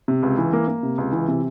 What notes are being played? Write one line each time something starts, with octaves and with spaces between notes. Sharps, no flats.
C3
C#2
E3
A#3
A#3
C3
C#2
E3
C3